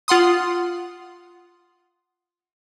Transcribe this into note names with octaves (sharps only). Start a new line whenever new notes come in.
F4 F#5 C6 D#6